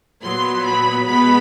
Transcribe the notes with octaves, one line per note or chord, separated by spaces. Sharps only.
A#2 F#3 B3 C6
B5
B2 G#3 B3 B5